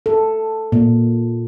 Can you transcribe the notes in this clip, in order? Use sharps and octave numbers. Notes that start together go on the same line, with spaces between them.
A4
A#2